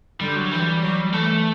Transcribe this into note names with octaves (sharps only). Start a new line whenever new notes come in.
D3 G3
F#3
E3 G3
F#3
E3 A3